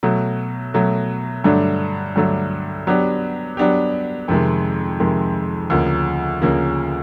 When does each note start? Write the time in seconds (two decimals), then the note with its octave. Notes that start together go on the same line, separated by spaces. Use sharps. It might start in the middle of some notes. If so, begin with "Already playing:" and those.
0.03 B2 F#3 A3
0.74 B2 F#3 A3
1.44 G2 D3 F#3 A3 D4
2.16 G2 D3 F#3 A3 D4
2.87 F#3 B3 D4 G4
3.57 F#3 B3 D4 G4
4.28 F2 C3 D#3 G#3
5.00 F2 C3 D#3 G#3
5.70 D2 C#3 F3 A#3
6.41 D2 C#3 F3 A#3